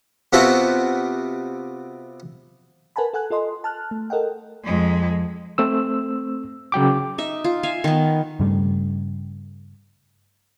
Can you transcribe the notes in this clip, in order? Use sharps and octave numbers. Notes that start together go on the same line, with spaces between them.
C3 B3 C4 F4 F#4 A4
A#4 B4 F#5 G#5 A5 B5
A4 F#5 G#5 F#6
F4 A4 D#5 C6
A5 F6 F#6
A3
A4 A#4 D#5 F#5 G5
F2 G#3
A3 C4 E6
C#3 F#3 G5 D6
D#4 E5
F4
E5 F5 G#5
D#3 B3
G2 C#3 G3 A3